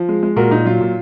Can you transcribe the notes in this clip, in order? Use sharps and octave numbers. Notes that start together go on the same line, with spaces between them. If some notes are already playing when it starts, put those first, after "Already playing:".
Already playing: F3
G#3
G#3
A#2 F#4 A#4
A#2 D#4
F#3 F4
A#2